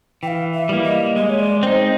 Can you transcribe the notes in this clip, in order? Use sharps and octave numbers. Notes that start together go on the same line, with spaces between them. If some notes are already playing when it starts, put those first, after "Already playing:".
E3 F5 G5
E5
G3 A#3
D#5
G#3 D#5
C#5
D5
C4 D#4 C5